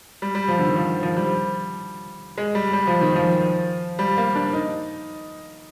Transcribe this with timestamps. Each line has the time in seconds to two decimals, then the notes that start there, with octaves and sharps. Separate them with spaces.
0.22 G3
0.35 G3
0.48 F3
0.59 D3
0.67 D#3
0.76 F3
1.03 F3
1.17 G3
2.38 G#3
2.55 G3
2.73 G3
2.87 F3
3.01 D#3
3.16 F3
3.99 G3
4.17 A#3
4.36 D4
4.53 D#4